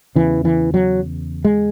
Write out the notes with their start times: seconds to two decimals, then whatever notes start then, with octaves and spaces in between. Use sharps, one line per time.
0.15 E2 C#3 E3
0.45 E3
0.74 F#3
1.45 G#3